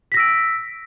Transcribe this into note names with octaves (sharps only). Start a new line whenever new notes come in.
E6 A#6 B6 D7